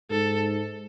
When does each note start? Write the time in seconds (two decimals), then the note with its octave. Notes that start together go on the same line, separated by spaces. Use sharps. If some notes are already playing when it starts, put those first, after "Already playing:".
0.10 G#2 A4